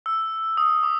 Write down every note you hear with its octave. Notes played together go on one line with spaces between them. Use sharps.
E6
D#6
D6